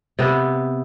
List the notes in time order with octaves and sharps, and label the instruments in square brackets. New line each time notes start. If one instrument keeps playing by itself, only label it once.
[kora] C3 B3